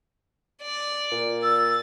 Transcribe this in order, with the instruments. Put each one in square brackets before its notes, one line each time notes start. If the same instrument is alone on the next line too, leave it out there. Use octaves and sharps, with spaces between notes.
[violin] D5
[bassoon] A#2
[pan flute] E6 [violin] A6